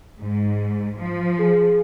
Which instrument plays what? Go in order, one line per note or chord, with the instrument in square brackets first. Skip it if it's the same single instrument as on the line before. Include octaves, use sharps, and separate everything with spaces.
[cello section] G#2
F3
[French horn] G#4